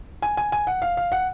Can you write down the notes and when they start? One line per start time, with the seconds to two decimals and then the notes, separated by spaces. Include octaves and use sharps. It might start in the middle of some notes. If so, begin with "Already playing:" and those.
0.22 G#5
0.37 G#5
0.52 G#5
0.67 F#5
0.82 F5
0.97 F5
1.12 F#5